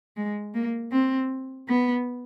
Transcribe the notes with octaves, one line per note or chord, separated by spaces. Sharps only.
G#3
A#3
C4
B3